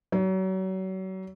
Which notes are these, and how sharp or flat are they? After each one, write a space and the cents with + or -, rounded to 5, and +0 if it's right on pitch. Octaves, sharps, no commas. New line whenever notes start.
F#3 +35